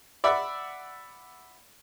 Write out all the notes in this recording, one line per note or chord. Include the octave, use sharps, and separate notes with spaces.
D5 E5 F#5 B5 E6